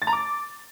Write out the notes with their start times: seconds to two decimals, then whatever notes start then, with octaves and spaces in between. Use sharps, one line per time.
0.02 A6
0.07 A#5
0.13 D6